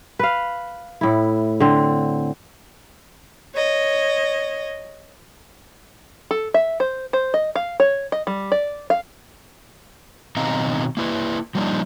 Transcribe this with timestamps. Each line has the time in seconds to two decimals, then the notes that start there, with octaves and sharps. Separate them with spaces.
0.19 B4 F5
1.01 A2 E4
1.60 D3 C4
3.54 C#5 D#5
6.31 A4
6.54 E5
6.80 C5
7.13 C5
7.34 D#5
7.56 F5
7.80 C#5
8.12 D#5
8.27 G3
8.52 D5
8.90 F5
10.37 B2 D#3 C4 D#5 F5 A#5
10.97 A#3 E4 B4
11.55 F3 G3 A#3 D4 D#4